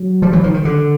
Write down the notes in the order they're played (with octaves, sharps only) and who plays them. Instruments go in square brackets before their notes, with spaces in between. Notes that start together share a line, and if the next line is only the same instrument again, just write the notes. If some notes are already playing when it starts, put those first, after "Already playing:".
Already playing: [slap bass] F#3
F3 G3
E3 F#3
D#3 F3
D#3
D3